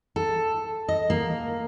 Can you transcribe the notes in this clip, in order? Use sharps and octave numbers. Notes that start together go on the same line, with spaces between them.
A4
D#5
A#3